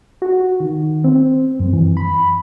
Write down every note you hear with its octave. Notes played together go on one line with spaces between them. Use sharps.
F#4
D#3
C4
F#2
E3
B5